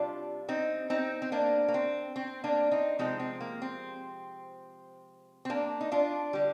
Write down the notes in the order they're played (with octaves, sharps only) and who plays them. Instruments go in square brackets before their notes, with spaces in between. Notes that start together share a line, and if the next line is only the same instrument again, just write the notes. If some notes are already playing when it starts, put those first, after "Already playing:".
Already playing: [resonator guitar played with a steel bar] C3 G3 D4 F4
C4 D#4
C4 D#4
C4
A#3 D4
A#3
C4
C4
A#3 D4
C4 D#4
C3 F3 G#3 C4 D#4
C4
A#3
C4
C4
A#3 D4
D#4
D4 F4
D3 G3